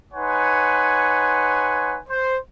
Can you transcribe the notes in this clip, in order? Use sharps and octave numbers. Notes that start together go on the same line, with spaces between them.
D#4 B4 C#5 F#5 G#5 C6
C5